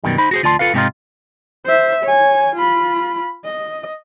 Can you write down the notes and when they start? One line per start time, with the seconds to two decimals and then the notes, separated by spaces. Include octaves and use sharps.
0.04 F#2 B2 D#3 G3
0.18 D#4 C5 B5
0.31 F#4 G#4 C5
0.43 D2 F4 D5 A5 C6
0.59 F4 A4 B4 F5
0.74 G#2 C3 C4 C#4 D#4 F4
1.65 C5 E5
2.03 C#5 G#5
2.56 F4 B5
3.44 D#5